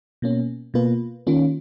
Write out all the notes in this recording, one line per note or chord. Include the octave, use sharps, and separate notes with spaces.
B2 A#3 C#4
B2 A#3 F4 B4
D#3 A#3 C#4 F4